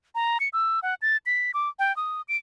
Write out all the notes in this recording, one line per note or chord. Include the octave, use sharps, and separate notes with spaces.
A#5
C#7
E6
F#5
A6
B6
D6
G5
D#6
D7